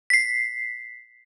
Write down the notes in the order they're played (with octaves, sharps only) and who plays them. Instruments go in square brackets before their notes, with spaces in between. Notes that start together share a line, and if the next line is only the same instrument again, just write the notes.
[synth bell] B6 C7